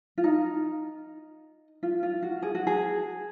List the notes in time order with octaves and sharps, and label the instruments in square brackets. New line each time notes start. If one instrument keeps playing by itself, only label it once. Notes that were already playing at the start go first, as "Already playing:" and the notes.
[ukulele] F4
D#4
F4
F4
F#4
G#4
F#4
G#4